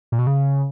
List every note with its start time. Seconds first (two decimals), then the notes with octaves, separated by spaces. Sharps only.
0.12 A#2
0.19 B2
0.27 C#3